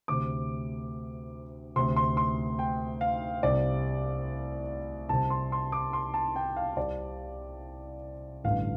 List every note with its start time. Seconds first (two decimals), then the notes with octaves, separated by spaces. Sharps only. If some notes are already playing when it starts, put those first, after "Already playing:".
0.08 D2 C3 D6
1.76 D2 C3 C6
1.96 C6
2.17 C6
2.59 G5
3.01 F5
3.43 C2 C3 D5
5.09 C2 C3 A5
5.30 C6
5.52 C6
5.72 D6
5.93 C6
6.14 A5
6.36 G5
6.57 F5
6.76 C2 C3 D5
8.44 A1 G2 D3 F5